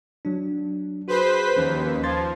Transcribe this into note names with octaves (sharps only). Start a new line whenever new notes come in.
F#3 D4
F#4 G#4 B4 C5 B6
D#2 F3 C#4 B4
F3 C6 G#6 A6